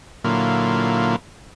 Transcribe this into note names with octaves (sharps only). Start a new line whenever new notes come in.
A#2 D3 F#3 A#3 E4 F4